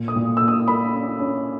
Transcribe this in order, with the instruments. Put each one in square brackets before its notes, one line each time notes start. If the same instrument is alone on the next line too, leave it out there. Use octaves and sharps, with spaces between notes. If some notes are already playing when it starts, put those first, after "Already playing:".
Already playing: [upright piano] A#2
D#6
A#2
A#3 E6
D#6
A#3 B5
C#4
C#4